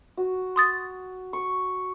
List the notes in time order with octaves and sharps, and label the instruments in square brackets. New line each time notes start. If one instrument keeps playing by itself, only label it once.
[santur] F#4
[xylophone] C6 D#6 A6
[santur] C#6